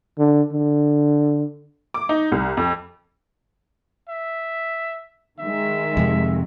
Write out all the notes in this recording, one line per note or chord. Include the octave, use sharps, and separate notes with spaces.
D3
D3
D6
D#4
C2
F2
E5
D#3 G#3 E5
F2 C3